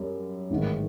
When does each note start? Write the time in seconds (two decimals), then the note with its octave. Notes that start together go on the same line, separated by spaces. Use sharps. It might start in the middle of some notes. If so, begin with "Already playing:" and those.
Already playing: F#2 G3
0.50 A1 G#2 D#3